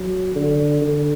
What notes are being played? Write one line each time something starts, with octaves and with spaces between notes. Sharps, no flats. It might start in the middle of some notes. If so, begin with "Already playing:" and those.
Already playing: F#3
D3
D3